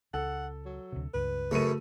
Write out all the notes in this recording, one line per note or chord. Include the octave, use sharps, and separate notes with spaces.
C#2 A4 F#5
F#3
D2 C3
C#2 G2 B4
F#2 C#3 A3 D#7